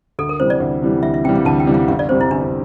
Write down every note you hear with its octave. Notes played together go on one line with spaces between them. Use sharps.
D2 A4
A#4
C3 E3 G3 C5
D5
D2
C3 E3 G3
D2 E5
E5
C3 E3 G3 G5
F5
D2 A5
G5
C3 E3 G3
F5
G1 F5
D5
F2 C3 G3 C5
E4
G1 D4